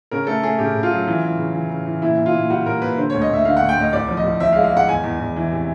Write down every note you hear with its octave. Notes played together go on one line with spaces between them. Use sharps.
C#3 A#4
A3 A4
A3 G#4
C#3 G4
C#3
F4
F#3
E3
E3
C#3
E3
C#3
E3
A#2 E4
A#2
F4
A#2
G3 F#4
A#2 A#4
A#2 B4
D3 C5
C#5
D2
D#5
D2 E5
D3 F5
F#5
D2
G5
D2 D#5
C2 D5
F3
D#5
C2
F3 E5
F5
G#3
F5
G#3 F#5
E2 G#5
E2
E2
E3
C3